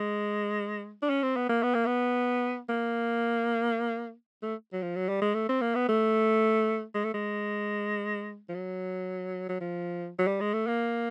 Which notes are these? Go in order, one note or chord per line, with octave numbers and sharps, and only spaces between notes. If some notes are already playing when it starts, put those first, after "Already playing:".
Already playing: G#3
D4
C#4
C4
B3
A#3
B3
A#3
B3
A#3
A3
F#3
F3
F#3
G3
G#3
A3
C4
A#3
B3
A3
G#3
A3
G#3
F3
F#3
F#3
F3
F#3
G3
G#3
A3
A#3